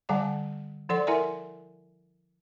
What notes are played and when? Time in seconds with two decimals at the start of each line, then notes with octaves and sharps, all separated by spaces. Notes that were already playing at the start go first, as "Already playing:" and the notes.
0.09 D3 G3 F5 F#5 A5 A#5
0.89 F3 A4 D5 F#5 C6
1.07 E4 A#4 E5 G#5 A#5 C6